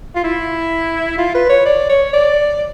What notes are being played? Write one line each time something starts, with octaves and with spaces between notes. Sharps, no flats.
F4
E4
F4
B4
C#5
D5
C#5
D5